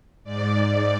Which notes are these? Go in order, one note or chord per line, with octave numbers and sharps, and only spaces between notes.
G#2 D5